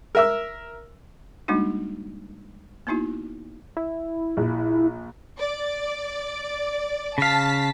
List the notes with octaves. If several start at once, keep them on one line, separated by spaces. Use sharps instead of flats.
A#4 E5 E6
G3 G#3 A#3 D4 D#4 F#4
A#3 B3 D#4 E4 F#4
E4
A#1
D5
C#3 F5 A5 B6